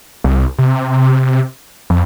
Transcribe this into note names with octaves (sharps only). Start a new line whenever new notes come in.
C2
C3
F2